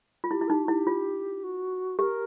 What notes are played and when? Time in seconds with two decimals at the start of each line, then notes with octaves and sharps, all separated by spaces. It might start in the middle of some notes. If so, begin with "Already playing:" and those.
0.24 F4
0.30 E4 G4
0.41 E4
0.47 D#4 G4 A#4
0.64 F#4
0.68 E4 G4
0.87 F4
1.43 F#4
1.99 G4 A#4